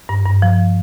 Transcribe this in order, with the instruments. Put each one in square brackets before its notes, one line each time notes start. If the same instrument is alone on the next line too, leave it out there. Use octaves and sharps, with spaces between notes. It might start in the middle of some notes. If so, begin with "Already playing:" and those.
[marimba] G2
G2
F3